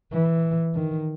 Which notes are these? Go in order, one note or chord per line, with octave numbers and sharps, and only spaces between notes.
E3
D#3